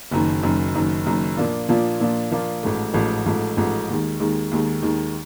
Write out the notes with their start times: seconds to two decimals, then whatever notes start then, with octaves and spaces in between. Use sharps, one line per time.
0.11 F#1 F#2 D#3
0.43 F#1 F#2 D#3
0.74 F#1 F#2 D#3
1.06 F#1 F#2 D#3
1.37 A#2 F3 A#3 D4 F4
1.69 A#2 F3 A#3 D4 F4
2.00 A#2 F3 A#3 D4 F4
2.31 A#2 F3 A#3 D4 F4
2.63 A1 G#2 F3 A3
2.94 A1 G#2 F3 A3
3.26 A1 G#2 F3 A3
3.57 A1 G#2 F3 A3
3.89 D#2 D#3 G#3
4.20 D#2 D#3 G#3
4.51 D#2 D#3 G#3
4.82 D#2 D#3 G#3